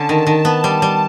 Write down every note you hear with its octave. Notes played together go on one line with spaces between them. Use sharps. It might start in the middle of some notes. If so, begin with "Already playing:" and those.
Already playing: D3 C#4 A5
D#3
D#3
B3
G3
G3